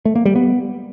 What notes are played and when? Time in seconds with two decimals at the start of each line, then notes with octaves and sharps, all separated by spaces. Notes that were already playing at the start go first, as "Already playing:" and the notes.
0.05 A3
0.15 A#3
0.25 G3
0.35 B3